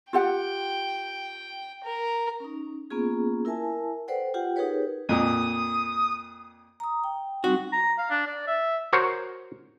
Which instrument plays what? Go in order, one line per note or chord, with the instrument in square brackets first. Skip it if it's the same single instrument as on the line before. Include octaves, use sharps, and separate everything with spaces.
[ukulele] F4 G4 F#5 [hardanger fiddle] G5
[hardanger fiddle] A#4
[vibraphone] C#4 D#4
A#3 B3 C#4 F4 G#4
E4 A#4 E5 G#5 A5
A4 B4 C5 D5 F#5 G5
F4 G4 F#5 G5
D#4 G4 G#4 A#4 B4 C#5
[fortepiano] F2 A#2 [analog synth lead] D#6
[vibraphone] A#5 D#6
G5
[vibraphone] G3 C4 D#4 [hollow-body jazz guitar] F#4
[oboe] A#5
F5
D4
D5
E5
[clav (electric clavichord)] F#4 A#4 C5 C#5 F#5